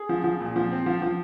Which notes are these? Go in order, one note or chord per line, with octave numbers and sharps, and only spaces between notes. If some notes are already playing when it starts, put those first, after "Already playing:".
Already playing: G#4
F3
F3
A#2
F3
C4
F3
F3